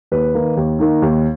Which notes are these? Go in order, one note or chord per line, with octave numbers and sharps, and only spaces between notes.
D#2 B4
D#3 A#3 D#4
D#2
D#3 A#3 D#4
D#2